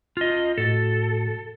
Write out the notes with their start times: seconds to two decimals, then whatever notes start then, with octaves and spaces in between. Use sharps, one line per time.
0.17 F4 D#5
0.58 A2 F#4 A4 A6